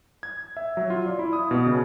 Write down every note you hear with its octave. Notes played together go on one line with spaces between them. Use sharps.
G#6
E5
F#3
F4
D5
E4
D#6
B2
C#3